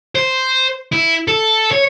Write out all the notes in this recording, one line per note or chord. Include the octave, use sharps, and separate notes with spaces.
C5
E4
A4
C#5